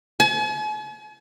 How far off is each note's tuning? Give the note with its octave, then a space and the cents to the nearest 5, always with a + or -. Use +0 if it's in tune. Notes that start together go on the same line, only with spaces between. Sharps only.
G#5 +45